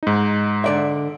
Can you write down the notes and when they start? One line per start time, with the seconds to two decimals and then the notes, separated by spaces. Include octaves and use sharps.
0.03 G#2 D#4
0.64 D3 D5 E5